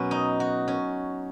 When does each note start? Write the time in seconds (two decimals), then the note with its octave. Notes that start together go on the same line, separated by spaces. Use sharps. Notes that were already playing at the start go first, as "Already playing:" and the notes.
Already playing: B2 F#3 B3 C#4
0.11 D#4
0.40 F#4
0.68 C#4